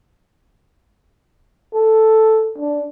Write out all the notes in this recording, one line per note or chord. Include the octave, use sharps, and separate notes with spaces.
A4
D4